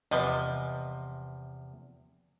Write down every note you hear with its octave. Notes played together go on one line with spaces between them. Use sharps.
E2 C3 F3 B4 D#5